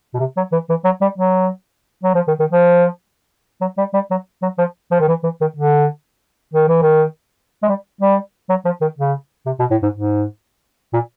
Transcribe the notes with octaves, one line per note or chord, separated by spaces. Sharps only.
B2
C3
F#3
E3
E3
F#3
G3
F#3
F#3
F3
D#3
D#3
F3
F#3
G3
G3
F#3
F#3
F3
F3
D#3
E3
E3
D#3
D3
D#3
E3
D#3
G#3
G3
G3
F#3
F3
D#3
C#3
C3
B2
A2
G#2
G#2
A#2